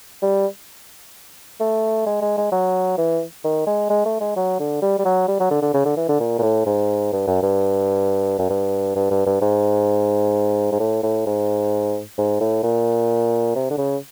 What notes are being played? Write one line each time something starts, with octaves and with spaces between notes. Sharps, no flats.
G3
A3
G#3
G#3
G#3
F#3
E3
D#3
G#3
G#3
A3
G#3
F#3
D3
G3
G3
F#3
G3
F#3
D3
D3
C#3
D3
E3
D3
A#2
A#2
A2
G#2
G2
F#2
G2
F#2
G2
G2
G2
G2
G#2
G#2
A2
A2
G#2
G#2
A2
A#2
C3
D3
C#3